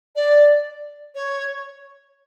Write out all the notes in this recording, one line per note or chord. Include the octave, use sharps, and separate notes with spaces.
D5
C#5